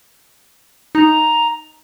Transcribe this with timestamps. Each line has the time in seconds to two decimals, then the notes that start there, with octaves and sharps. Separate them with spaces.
0.95 D#4 A#5